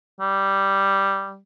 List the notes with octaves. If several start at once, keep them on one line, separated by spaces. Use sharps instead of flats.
G3